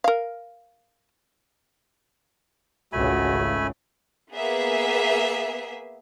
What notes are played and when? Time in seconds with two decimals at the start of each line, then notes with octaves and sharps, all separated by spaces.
0.04 A#4 F5
2.93 G#1 C#2 C#3 A3 F#4 G#5 B5
4.32 A#3 B3 G#4 E5